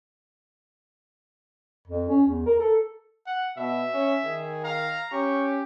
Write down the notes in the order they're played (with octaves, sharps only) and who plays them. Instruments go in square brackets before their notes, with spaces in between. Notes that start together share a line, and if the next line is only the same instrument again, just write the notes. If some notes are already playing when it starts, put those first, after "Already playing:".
[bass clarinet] F2
C#4
E2
A#4
A4
[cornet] F#5
[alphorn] B2 [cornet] E5
[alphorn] C#4
[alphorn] D#3 [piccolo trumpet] G#4
[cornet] F5 [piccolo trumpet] A#5
[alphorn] C#4 [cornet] G4 [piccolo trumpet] C#6